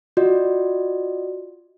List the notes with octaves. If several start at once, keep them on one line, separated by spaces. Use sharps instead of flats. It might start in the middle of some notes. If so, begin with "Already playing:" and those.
F4 F#4 D5 D#5